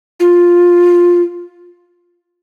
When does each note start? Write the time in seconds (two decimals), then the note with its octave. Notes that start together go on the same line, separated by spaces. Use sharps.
0.20 F4